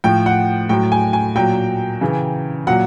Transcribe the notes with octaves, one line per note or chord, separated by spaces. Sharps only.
A2 F3 G5
F#5
A2 F#3 G5
G#5
G#5
A#2 F#3 G5
C#3 E3
A#2 F#3 F#5